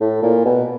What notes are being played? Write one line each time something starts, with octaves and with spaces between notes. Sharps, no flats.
A2
A#2
B2